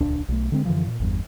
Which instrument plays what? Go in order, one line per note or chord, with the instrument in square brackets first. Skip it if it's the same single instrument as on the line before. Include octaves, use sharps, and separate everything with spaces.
[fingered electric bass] D#1 C#2 D4
B1 A3
D3 G#3 C4
F#2 D3 E3 F3
A#2
G1 E2 G2